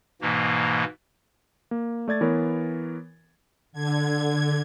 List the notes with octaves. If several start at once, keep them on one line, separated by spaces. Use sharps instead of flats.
G#2 B2 E3 A#3
A#3
A3 D5 G#6 A6
E3 B3 A#4 C#5
D3 G#6